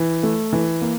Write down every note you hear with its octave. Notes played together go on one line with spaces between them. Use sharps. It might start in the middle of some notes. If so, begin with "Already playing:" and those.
Already playing: E3
A3
E3
A#3